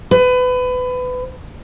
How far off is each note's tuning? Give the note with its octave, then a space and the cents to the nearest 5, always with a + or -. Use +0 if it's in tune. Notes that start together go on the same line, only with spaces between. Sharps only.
B4 +25